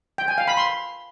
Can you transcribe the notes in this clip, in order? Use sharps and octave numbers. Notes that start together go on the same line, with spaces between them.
G5
G#5
F5
B5
C6